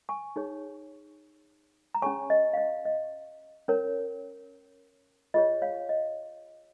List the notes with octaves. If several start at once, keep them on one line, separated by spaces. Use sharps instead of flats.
G#5 C#6
D#4 G#4 C#5
A#5
C#4 G#4 C#5 G#5 C#6
D#5
F5
D#5
D#5
C#4 A#4 C#5
F4 G#4 C#5 D#5
C#5 F5
D#5